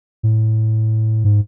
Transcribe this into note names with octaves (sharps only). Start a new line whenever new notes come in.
A2
G#2